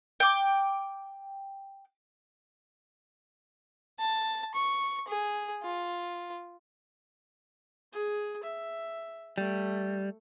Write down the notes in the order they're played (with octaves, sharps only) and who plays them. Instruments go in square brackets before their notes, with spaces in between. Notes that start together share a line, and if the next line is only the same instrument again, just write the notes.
[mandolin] G5 D6
[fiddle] A5
C#6
G#4
F4
[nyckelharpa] G#4
E5
[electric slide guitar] G3 [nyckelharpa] A3